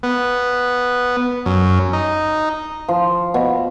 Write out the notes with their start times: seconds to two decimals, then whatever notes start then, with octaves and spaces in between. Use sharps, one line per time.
0.03 B3
1.46 F#2
1.93 D#4
2.88 F3
3.34 B2